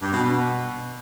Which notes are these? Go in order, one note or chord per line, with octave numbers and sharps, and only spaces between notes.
G2
B2
B2